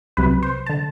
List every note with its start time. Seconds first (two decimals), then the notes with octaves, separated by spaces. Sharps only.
0.17 C2 C3 F#3 B4
0.43 C5
0.66 D3 A5